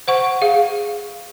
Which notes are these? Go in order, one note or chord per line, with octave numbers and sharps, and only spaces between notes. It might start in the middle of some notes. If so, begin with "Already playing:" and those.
C5 F#5 C#6
G#4 F5